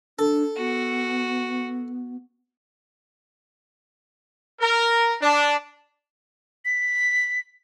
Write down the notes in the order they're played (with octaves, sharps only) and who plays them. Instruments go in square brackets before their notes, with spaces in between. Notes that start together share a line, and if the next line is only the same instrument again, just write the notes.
[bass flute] D4 [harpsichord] A4
[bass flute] B3 [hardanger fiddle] F#4
[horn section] A#4
D4
[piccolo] B6